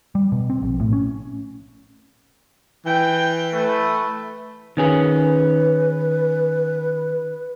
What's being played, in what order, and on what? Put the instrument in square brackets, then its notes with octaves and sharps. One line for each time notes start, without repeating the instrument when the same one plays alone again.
[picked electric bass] G3
B2
C4
A#1
A2
C#4
[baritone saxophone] E3 [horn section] G5
[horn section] A3 B4
[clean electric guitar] D#3 C#4 G#4 [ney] B4